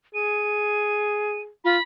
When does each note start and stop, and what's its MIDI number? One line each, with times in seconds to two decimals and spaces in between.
0.14 1.50 68
0.14 1.41 99
1.64 1.77 65
1.64 1.82 83